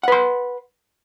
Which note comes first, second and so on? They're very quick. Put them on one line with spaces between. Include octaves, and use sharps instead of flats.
F#5 B4 C6